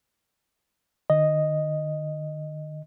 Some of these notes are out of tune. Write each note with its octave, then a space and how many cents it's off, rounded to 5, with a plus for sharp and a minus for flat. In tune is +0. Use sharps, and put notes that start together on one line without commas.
D#3 -45 D#5 +0